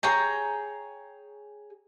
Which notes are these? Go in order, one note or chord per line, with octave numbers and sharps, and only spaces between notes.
G#4 C#5 G5 A#5